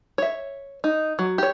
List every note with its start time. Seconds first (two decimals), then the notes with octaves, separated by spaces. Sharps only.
0.18 C#5 E5
0.84 D#4
1.19 F#3
1.38 G4 C#5